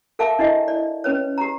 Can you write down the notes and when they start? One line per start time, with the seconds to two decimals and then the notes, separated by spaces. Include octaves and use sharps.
0.19 A4 A#4 E5 F5 A5 D6
0.39 D4 E4 G4 D#5 E5
0.68 D5
1.04 C#4 B4 C#5
1.38 G4 A#5